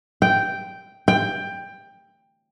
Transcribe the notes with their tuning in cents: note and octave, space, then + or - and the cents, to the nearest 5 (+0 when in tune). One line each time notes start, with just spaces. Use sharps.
G5 -5
G5 +15